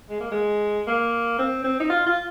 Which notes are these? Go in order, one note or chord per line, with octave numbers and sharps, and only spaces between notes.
G#3
A#3
G#3
A#3
C4
C4
D#4
F4
F4